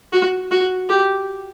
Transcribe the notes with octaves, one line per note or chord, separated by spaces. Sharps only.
F#4
F#4
G4